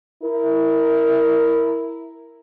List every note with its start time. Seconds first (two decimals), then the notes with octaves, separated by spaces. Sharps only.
0.23 E4 A#4